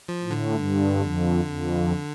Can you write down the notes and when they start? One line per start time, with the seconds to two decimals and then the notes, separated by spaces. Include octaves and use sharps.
0.08 F3
0.23 A2
0.30 D3
0.54 G2
0.99 F2
1.45 F2